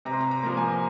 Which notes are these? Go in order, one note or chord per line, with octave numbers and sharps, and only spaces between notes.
C3 A#5
C6
A#5
A#5
F3 A#3
G#5